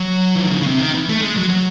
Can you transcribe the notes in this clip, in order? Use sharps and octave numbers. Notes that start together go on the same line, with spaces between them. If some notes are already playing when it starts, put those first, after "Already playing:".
Already playing: F#3
E3
D#3
D3
C#3
C3
D#3
E3
A3
G#3
F#3
F#3